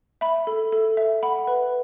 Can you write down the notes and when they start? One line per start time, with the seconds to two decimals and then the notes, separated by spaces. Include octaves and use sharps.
0.21 E5 B5
0.47 A4
0.72 A4
0.97 E5
1.23 F#5 B5
1.47 B4